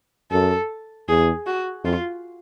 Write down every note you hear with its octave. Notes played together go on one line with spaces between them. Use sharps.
F#2 A4
E2 G#4
F#4
F2 F4